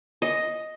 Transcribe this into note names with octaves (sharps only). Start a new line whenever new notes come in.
D#5